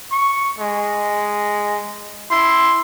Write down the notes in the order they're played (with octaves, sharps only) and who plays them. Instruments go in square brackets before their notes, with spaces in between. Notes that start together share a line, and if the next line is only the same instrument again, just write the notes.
[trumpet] C#6
G#3
[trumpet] E4 [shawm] C6